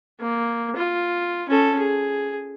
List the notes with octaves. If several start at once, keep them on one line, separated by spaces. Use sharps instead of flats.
A#3
F4
C#4 A4
G#4